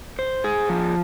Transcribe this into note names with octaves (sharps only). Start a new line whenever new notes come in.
C5
G#4
F3